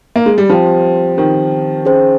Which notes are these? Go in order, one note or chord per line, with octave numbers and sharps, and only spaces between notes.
A#3
G#3
G3
F3 C4 G4 C5 G5
D#3 C4 G4 C5 G5
C#4 G#4 C5 G5